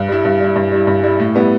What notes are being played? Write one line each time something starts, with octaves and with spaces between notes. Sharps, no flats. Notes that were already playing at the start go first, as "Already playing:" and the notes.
Already playing: G2
G3 E4
G2
G3 E4
G2
G3 E4
G2
G3 E4
A2
G3 B3 E4